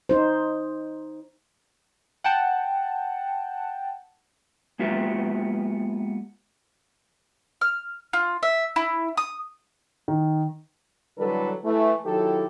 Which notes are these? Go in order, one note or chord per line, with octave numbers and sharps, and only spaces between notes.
D#4 C5
F#5 G5 A5
G#3 A#3 B3 F4 G4 E5
F6
F4
E5
E4
D#6
D#3
D3 E3 F#3 G3 A4 B4
E3 A3
D#3 F#3 E4 G4 A4